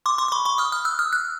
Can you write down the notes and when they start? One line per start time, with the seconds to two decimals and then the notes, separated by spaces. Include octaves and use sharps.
0.06 C6 D6
0.18 C6 D6
0.28 D6
0.32 B5 C#6
0.45 B5 C#6
0.58 D#6 F6
0.72 D#6 F6
0.85 E6 F#6
0.99 D#6 F6
1.13 E6 F#6